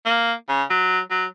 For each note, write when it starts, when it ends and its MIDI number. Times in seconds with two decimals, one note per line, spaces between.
0.05 0.33 58
0.48 0.63 49
0.70 0.99 54
1.10 1.25 54